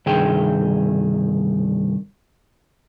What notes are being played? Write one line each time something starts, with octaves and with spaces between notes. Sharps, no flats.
C2 G2 D#3 G#4 G5